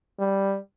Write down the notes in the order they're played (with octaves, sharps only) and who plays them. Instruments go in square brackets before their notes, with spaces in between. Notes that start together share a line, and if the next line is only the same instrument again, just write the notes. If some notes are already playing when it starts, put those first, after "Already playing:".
[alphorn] G3